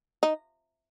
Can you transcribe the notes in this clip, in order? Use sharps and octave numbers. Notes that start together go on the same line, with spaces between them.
D#4